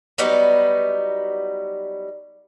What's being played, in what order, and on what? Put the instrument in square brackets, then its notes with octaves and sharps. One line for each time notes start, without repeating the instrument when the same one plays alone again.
[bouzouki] F#3 G3 B3 D#4